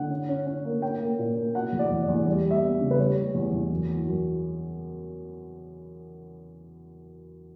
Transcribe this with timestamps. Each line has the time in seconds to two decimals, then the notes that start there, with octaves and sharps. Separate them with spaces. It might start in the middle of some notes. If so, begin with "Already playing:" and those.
Already playing: D3 F#5
0.10 C#4
0.29 C#4
0.46 C#4
0.65 A#3
0.82 C#4 G5
1.00 A#3
1.18 A#2
1.36 A#3
1.54 B2 F#5
1.73 E2
1.79 D5
1.90 E2
2.03 D5
2.08 E2
2.26 G3 D5
2.45 G3
2.51 E5
2.62 B3
2.81 C#3
2.91 B4
2.98 G3 C#5
3.16 G3
3.35 E2
3.53 E2
3.71 F#2
3.89 E3
4.07 F#2